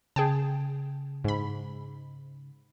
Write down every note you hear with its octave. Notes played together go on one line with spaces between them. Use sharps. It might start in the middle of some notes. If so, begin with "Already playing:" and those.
C#3 G#4 G5 A5
G#2 B5